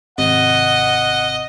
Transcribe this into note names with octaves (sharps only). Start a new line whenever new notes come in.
G#1 C3 D#5 F#5